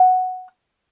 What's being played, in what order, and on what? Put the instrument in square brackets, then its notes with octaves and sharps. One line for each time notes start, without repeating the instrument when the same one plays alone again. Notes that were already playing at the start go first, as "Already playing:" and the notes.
Already playing: [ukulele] F#5